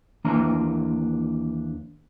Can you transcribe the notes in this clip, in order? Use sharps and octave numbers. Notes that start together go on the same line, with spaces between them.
D#2 E3 A#3 D4 A#5